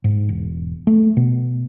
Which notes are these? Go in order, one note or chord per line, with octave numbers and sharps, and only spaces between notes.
G#2
E1
A3
B2